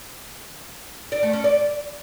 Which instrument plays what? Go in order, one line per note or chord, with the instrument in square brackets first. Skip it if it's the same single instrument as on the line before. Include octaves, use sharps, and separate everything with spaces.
[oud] D5
A3
C#4
D5